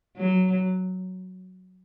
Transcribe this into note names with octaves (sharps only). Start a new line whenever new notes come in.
F#3